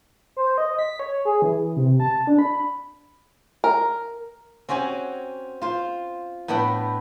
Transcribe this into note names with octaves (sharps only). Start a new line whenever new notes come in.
C5
D#5
B6
C#5
G#4
E3
C3
A5
D4
B5
A#4
C4 C#4 F#4 G4 G#5
F4 C5
A2 B3 D4 F#5 G5